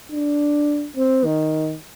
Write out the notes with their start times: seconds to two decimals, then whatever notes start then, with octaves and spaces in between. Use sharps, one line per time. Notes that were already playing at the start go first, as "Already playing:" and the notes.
0.12 D4
0.97 C4
1.24 D#3